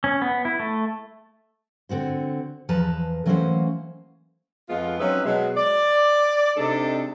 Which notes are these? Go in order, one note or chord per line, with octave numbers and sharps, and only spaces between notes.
C#4
B3
E4
A3
D3 C4 F#4 C5
E2 F3 B4 A5 A#5
E3 F#3 A3 A#3 C#4 C5
F2 G#3 B3 F4
F#3 C4 C#4 D#4 B4 E5
B2 F#3 G#3
D5
C3 G#3 C4 D4 D#4 A4